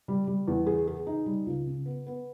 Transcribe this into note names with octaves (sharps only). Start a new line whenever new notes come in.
G3
G3
E2
G#4
G#4
D#4
G3
C#2
C#3
B3
B3